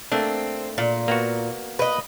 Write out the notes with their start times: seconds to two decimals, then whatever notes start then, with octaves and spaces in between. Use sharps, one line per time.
0.12 A3 A#3 C4 D4
0.78 A#2
1.08 A#3 B3 F#4
1.79 B4 D#5